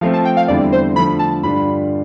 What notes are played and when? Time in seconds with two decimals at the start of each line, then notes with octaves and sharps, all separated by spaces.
0.01 F3 A3 C4 F5
0.13 A5
0.25 G5
0.37 F5
0.48 E2 D3 G3 C4 E4 D5
0.72 C5
0.95 D3 F3 A3 B5
1.19 A5
1.43 G2 D3 G3 D4 F4 B5